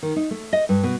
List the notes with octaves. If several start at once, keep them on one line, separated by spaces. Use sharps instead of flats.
D#3
D#4
A3
D#5
G2
B2